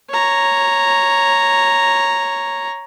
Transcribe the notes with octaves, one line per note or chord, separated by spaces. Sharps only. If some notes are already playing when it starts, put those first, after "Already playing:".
C#5 A#5